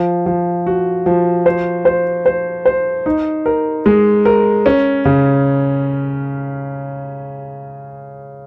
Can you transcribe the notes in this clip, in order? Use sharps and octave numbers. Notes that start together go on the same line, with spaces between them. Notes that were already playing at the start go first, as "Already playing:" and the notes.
Already playing: F3
F3
F#4
F3
C5
C5
C5
C5
D#4
A#4
G#3
A#4
C#4
C#3